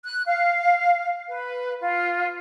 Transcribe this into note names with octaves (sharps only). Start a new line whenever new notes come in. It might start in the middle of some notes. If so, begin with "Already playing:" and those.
F#6
F5
B4
F4